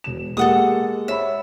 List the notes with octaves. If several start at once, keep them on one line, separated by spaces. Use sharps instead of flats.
E1 E7
G#3 A#3 G4 A4 F#5 D#6
C#5 E5 B5